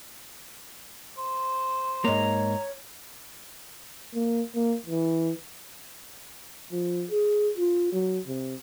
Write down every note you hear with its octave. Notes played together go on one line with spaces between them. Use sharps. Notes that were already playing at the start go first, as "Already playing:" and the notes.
C5
G#2 A#3 C#5 A#5
A#3
A#3
E3
F3
G#4
F4
F#3
C3